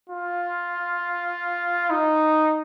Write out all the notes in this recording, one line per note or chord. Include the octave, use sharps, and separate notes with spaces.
F4
D#4